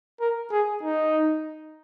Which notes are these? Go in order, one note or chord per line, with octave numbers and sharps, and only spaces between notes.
A#4
G#4
D#4